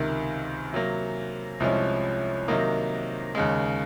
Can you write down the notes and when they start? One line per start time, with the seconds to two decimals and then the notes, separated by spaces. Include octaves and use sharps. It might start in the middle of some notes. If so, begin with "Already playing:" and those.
Already playing: C#2 C3 D#3
0.73 C3 F#3 A#3
1.60 C2 C3 F3 G#3 C#4
2.48 C3 D#3 F#3 A#3 D#4
3.35 D#2 C#3 G#3